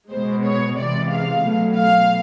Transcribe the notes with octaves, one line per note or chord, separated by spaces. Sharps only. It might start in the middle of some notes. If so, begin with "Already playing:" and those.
B2 G#3 C5
C#5
C3 E3 G#3 D5
F5
B2 F#3 A3
F5